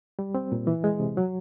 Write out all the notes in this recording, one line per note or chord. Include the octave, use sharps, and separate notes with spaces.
G3
C4
A#2
E3
G#3
C3
F#3